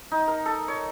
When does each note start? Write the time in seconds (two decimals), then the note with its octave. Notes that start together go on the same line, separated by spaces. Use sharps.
0.11 D#4
0.27 A#4
0.46 A4
0.68 C#5